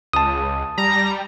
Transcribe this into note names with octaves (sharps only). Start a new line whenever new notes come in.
C#2 A5 D#6
G3 A#5